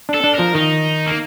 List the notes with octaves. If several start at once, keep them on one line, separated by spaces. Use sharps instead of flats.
D4
A4
D4
F3 A#4
D#3 D#4
A#3